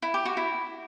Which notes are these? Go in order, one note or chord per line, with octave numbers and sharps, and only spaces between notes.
E4
G4
F#4
E4